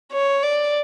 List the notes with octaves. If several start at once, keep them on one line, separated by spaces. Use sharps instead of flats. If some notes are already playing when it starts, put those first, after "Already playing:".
C#5
D5